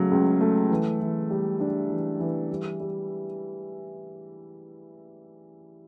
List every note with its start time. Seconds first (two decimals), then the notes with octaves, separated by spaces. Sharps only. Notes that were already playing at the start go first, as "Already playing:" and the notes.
Already playing: C#2 C#3 F#3 A3
0.11 C#2
0.41 A3
0.70 E3
1.00 E3
1.30 G3
1.60 D4
1.89 E3
2.20 E3
2.50 G3
2.80 G3